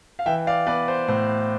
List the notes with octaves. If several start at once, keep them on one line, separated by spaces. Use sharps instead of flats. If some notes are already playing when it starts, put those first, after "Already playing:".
F5
E3 E5 G5
D5 F5
B3 B4 D5
C5
A2 C5